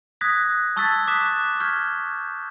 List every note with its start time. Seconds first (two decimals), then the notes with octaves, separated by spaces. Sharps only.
0.21 D#6 F#6 G#6 A#6 B6
0.76 A5 C#6 E6 G#6 A6 B6
1.07 D6 D#6 F#6 B6 E7
1.60 C#6 F6 G6 G#6 B6